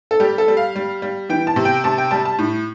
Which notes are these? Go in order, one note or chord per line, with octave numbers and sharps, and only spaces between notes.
A4
G3 G4
A4
G3
F5
G3
G3
E3 G5
A5
C3
G5
C3 A5
G5
G3 A5
A5
A2